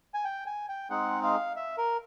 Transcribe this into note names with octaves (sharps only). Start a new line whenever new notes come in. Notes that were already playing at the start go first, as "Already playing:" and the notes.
G#5
G5
G#5
G5
G#3 C4 D#4 G#4 F#5
F5
E5
A#4